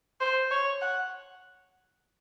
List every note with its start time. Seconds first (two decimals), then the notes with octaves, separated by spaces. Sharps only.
0.21 C5
0.51 C#5
0.82 F#5